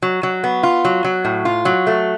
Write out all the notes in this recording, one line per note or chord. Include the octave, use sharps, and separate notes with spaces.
F#3
F#3
B3
F4
F#3
F#3
A2
F4
F#3
A3